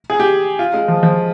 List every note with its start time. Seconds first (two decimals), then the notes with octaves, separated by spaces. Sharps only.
0.10 G#4
0.20 G4
0.59 F4
0.74 G#3
0.88 F3
1.03 F3